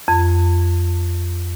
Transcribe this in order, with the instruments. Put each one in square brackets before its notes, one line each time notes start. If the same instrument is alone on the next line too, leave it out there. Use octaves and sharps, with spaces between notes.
[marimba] F2